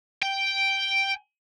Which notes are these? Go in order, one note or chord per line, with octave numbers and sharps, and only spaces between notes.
G5